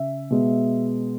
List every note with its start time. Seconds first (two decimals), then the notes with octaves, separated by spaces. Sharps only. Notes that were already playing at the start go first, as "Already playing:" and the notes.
Already playing: C#3 E5
0.30 B2 G#3